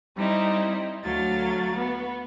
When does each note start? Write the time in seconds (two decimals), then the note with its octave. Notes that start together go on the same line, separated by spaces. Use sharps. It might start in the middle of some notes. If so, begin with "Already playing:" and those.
0.18 G3 C4 D#4 E4
1.05 D2 F#3 F5 A6
1.76 B3